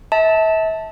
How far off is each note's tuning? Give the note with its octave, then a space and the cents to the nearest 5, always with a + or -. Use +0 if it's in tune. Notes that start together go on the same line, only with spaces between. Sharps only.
E5 -35 A5 +0